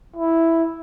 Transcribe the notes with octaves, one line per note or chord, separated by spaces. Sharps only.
E4